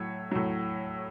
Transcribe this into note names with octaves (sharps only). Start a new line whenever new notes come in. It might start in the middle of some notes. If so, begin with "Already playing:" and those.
Already playing: A2 F#3 C#5
A2 F#3